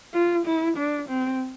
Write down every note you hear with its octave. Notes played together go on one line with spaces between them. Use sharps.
F4
E4
D4
C4